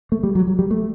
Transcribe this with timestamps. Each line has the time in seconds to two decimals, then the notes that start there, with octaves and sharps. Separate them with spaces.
0.12 A3
0.23 G3
0.35 F#3
0.47 F#3
0.59 G3
0.71 A3